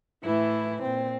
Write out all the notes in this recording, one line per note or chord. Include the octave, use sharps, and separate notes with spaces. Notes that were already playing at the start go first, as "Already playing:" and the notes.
A2 E3 E4
A#2 C4